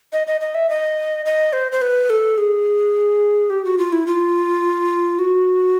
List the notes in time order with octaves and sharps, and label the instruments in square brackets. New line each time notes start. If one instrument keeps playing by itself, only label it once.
[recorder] D#5
D#5
D#5
E5
D#5
D#5
C5
C5
B4
A4
G#4
G4
F#4
F4
E4
F4
F#4